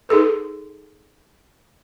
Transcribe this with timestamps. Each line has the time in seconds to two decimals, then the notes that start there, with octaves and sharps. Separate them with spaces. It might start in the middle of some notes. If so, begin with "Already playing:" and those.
0.09 D#4 G#4 A4 B4